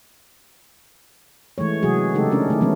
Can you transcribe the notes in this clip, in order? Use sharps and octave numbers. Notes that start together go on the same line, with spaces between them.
E3 G#3 A3 C#5
C3 E3 F#3 G#3 F#4 G#4
C#3 G#3 A3 D#4 G4 A4
A3 C#4 D4 A#4
D#3 A3 E4
E3 F#3 G#3 A3 B3 C#4